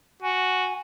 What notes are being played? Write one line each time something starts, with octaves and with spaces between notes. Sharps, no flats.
F#4 G#5